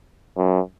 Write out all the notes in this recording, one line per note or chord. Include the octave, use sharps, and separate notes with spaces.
F#2